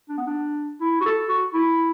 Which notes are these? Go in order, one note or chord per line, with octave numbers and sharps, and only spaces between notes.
D4
B3
D4
E4
F#4
A4
F#4
E4